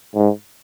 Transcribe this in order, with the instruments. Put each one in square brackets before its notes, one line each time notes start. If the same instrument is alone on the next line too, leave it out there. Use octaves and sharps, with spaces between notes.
[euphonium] G#2